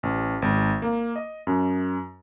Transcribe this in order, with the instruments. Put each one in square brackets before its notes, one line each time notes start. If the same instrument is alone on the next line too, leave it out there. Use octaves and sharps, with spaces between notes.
[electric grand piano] A1
G#1
A#3
D#5
F#2